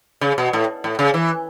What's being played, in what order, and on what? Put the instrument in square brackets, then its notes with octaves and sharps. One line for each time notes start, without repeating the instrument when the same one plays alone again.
[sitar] C#3
B2
A2
A2
C#3
E3